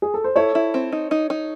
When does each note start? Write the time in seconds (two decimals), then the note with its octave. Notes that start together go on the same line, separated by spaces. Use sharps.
0.02 G#4
0.14 A4
0.24 C5
0.36 E4 A4 C#5
0.55 E4
0.74 C4
0.92 D#4
1.11 D#4
1.30 D#4